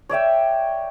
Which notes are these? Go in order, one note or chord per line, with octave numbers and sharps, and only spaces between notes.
C#5 D5 E5 G5